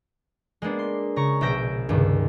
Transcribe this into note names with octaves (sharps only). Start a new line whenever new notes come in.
G#3 A#3 B3 D4
C6
C#3 A#5 C#6
A#1 B2 E5 G6 A#6 D7
C#2 G2 C3 D#3